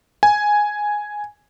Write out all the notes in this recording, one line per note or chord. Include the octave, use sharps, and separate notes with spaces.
G#5